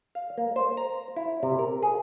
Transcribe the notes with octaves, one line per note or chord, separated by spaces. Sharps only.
F5
A#3
C5
A#5
E4
C3
A#4
G#4